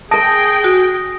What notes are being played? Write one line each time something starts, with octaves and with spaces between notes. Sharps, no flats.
G#4 A#4 G5 A5 D#6 A#6 D7
F#4